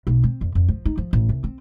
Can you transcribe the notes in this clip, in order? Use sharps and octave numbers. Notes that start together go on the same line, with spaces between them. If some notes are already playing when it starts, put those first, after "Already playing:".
B1
C4
F2
F2
F3
D#4
F3
A1
C2
C4